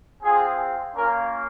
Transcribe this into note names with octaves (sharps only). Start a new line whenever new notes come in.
C4 F4 G#4
A#3 C#4 F4 A#4